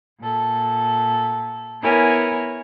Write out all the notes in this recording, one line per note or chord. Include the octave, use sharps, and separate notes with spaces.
A#2 A4
B3 E4 A#4 C#5 G#5